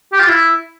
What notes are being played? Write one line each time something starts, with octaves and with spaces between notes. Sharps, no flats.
G4
F4
E4